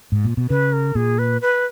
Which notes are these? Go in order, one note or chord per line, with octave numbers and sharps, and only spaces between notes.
G#2
A#2
B2
C#3 B4
A#4
A#2 G#4
B4
B4